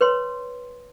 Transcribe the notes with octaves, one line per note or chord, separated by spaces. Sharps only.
B4 C#5 C6